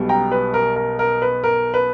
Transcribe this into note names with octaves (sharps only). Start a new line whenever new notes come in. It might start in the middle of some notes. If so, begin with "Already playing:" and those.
Already playing: B1 B2 G3
G5 A#5
B4
A#4
A#4
A#4
B4
A#4
B4